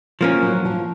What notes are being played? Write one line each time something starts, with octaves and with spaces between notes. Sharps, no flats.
F3 A#3 C#4
F#3
F3